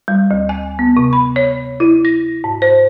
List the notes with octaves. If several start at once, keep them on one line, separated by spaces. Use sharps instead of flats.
G3
D2
G#5
B3
C3
B5
C#5
E4
A#6
G#2
C5